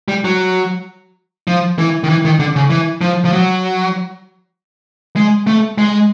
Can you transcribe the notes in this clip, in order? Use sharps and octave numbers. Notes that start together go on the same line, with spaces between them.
G3
F#3
F3
E3
D#3
E3
D#3
D3
C#3
E3
F3
F3
F#3
G#3
A3
G#3